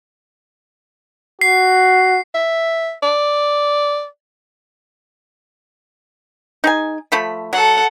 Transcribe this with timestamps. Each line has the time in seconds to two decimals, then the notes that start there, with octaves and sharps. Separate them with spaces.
1.41 F#4 C7
2.35 E5
3.03 D5
6.64 D#4 G#4 G#5
7.12 F3 A3 B5
7.53 F#3 A4 F#5